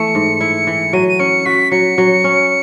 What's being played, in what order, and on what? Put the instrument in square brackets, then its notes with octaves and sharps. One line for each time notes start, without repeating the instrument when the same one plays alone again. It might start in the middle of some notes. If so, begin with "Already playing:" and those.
Already playing: [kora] E3 A3 [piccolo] C#7
[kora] G#2
E4
E3
[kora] F#3 [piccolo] D#7
[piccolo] D#7
[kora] C#4 [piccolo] C#7
[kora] F#4 [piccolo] B6
[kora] F#3 [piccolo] C#7
[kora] F#3
C#4